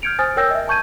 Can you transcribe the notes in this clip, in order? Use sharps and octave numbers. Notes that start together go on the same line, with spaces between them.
F6 G6 G#6 C#7 D7 F7
C5 G#5 D#6 F6 A6
A#4 C#5 G5 E6 G6 A#6
D#5 E5
G#5 A5 C#6 G6 G#6 D#7